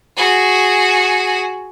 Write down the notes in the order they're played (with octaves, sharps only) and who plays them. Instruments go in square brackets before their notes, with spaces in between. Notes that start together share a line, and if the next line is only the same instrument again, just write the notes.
[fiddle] F#4 G#4